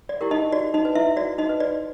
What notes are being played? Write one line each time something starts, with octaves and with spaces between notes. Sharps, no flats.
D5
E4 G4 A#4
D#4 D#5
F#4 D5
D#4 D#5
B4
E4 E5
F#4 D5
D#4 D#5
B4
D5